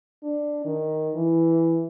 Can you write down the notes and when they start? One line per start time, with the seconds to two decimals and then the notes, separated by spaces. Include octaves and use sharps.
0.23 D4
0.65 D#3
1.15 E3